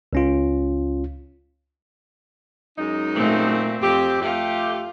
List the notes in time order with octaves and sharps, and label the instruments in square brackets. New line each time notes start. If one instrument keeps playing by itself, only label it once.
[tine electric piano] C#2 C#4 F4
[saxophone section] F#2 G#3 D#4
[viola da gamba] A#2 A3 C4
[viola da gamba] F2 [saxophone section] C4 G4
[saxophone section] A3 G4 [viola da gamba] F4